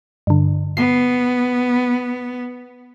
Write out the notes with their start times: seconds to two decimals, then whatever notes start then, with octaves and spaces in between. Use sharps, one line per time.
0.27 G2 D3
0.77 B3 C7